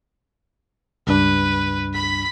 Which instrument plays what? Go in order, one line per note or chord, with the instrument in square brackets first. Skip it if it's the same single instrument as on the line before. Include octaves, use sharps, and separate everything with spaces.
[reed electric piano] C#2 G2 D4 [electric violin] B4
[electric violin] B5 B6